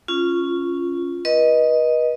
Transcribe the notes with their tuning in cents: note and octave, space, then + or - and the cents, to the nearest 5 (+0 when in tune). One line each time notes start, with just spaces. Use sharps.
C#4 +0 F4 -10
B4 -35 D#5 +0